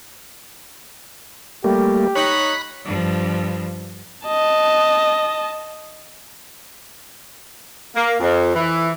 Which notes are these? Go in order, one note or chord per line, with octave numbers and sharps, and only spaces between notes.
G3 A3 A#3 G4
D#4 C#5 B5 F#6
G2 F3
D#5 A5
A#3
F2
E3